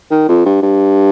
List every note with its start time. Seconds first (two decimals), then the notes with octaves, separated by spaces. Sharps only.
0.11 D#3
0.29 F2
0.46 G2
0.62 G2